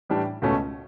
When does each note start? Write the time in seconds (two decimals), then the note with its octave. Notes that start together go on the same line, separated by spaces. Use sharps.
0.09 A2 E3 G3 D4
0.42 C#2 B2 A3 C#4